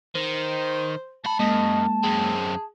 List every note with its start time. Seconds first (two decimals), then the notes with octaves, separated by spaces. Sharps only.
0.15 D#3 C5
1.25 A3 A5 B5
1.39 F#2 G#3 A#3 D#5
2.03 F#2 C4 G#4